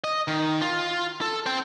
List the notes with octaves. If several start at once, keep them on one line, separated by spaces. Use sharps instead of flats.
D#5
D#3
F4
A4
C5 G5